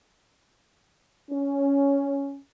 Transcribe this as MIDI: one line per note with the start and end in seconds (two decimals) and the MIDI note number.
1.31 2.38 61